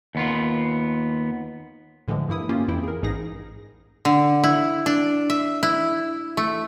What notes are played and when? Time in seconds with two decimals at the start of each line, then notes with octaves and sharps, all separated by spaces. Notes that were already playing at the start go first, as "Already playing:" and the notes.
0.15 D#2 B3 F4
2.08 A2 D3 E3 F3 G#3
2.29 G2 A#3 E4 D#6
2.49 A#3 C#4 F4 G4
2.68 F2 E3 E4 G5
2.83 G#4 A#4
3.03 A1 G#2 D#4 G#4 A#6
4.05 D3
4.44 E4
4.86 D4
5.30 E5
5.63 E4
6.37 A3